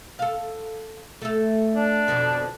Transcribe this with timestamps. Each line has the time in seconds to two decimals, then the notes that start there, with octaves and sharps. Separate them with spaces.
0.19 A4 F5
1.22 A3 A4
1.75 D4
2.08 F2 B2 D3